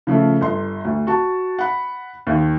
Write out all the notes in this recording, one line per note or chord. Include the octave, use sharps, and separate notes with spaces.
C#3 F3 A3
G1 C6
D2
F#4 A5
F#5 B5
D#2 D#3